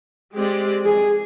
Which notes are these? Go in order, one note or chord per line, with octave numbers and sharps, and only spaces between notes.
G#3 C4 G4 D5
G#4